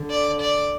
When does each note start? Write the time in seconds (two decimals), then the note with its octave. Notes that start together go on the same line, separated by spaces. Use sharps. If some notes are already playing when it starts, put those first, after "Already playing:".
Already playing: D3
0.10 D5
0.41 D5